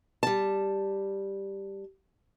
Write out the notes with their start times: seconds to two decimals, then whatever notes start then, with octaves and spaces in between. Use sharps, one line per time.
0.23 G3 A5